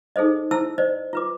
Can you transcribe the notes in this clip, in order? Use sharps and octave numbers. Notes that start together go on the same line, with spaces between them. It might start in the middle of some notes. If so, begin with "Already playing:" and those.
D#4 G#4 A4 C5 D#5
E4 C5 A5 E6
C5 D5 D#5
F4 B4 D6